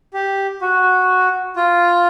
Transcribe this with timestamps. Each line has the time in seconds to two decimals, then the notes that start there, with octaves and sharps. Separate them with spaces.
0.14 G4
0.61 F#4
1.56 F4